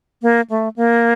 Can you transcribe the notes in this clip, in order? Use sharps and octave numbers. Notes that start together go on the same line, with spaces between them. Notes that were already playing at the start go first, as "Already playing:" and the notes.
A#3
A3
A#3